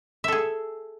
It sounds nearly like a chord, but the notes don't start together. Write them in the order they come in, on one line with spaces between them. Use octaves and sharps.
E5 A4 G#4